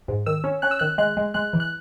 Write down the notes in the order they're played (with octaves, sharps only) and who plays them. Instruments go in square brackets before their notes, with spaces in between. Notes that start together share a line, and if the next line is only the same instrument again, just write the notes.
[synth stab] G#2
D#3 E6
C#4
C#4 F#6
E6
D#3 F#6
G#3 F#6
G#3
G#3 F#6
E3
F#6